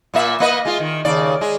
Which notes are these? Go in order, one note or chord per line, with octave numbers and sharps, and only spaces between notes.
A#2 A#3 E5
A#3 B4 D#5
G#3 F4
D#3
D#2 C#3 D5
G#3